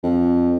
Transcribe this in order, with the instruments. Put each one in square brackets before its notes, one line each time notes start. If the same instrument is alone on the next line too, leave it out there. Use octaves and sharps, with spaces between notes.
[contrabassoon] F2